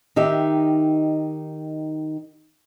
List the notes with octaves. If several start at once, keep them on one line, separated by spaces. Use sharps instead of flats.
D#3 D#4 G4 E5